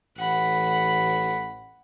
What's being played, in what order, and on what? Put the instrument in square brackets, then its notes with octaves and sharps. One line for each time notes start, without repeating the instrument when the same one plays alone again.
[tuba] A1 [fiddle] F#5 B5